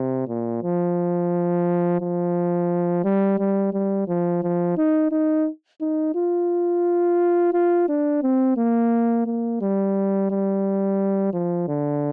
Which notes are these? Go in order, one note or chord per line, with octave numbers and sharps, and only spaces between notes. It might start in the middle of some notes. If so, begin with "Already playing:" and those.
Already playing: C3
A#2
F3
F3
G3
G3
G3
F3
F3
D#4
D#4
D#4
F4
F4
D4
C4
A#3
A#3
G3
G3
F3
D3